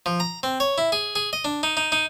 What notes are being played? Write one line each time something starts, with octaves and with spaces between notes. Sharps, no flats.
F3
A#5
C4
C#5
E4
G#4
G#4
D#5
D4
D#4
D#4
D#4